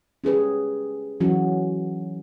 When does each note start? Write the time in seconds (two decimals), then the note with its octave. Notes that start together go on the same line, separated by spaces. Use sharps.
0.24 C#4 G4 G#4 B4
1.20 E3 F#3 C#4 F#4